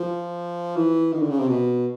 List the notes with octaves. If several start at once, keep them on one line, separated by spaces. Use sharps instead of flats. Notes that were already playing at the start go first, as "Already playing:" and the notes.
Already playing: F3
E3
D#3
D3
C#3
C3
B2